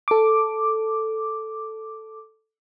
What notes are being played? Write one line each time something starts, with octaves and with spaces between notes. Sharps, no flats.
A4 D6